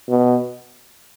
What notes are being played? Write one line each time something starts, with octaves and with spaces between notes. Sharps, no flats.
B2